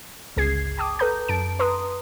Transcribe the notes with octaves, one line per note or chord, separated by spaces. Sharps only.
G1 C#2 G#4 G#6 C7
G5 A5 D6 D#6
A4 B4 A#5 G6
F#2 A5 D7
B4 A#5 C6 D#6